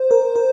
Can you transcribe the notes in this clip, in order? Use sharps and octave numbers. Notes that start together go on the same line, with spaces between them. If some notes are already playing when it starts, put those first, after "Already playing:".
Already playing: C5
A#4
A#4